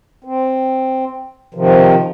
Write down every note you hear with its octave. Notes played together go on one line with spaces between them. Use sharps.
C4
C3 D#3 F3